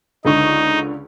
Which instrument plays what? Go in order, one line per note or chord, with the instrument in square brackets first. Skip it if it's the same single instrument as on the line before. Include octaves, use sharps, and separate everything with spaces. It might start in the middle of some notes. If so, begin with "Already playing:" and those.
[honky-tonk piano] C#2 D3 C#6 [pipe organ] D#4